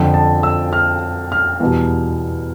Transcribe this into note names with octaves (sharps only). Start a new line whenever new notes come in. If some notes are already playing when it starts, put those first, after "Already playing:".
Already playing: F2 D3 F3 G5
A5
E6
F6
F6
E2 B2 G3